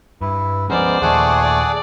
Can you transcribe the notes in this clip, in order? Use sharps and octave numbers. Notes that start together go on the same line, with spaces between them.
G2 E4 B4
F3 G#3 B3 C#4 A#4 C5 D5
D#2 A#2 D#3 A3 G#4 F#5 C#6 D6
D5